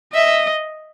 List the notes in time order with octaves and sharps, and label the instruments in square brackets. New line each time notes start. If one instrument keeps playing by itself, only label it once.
[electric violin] D#5 [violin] E5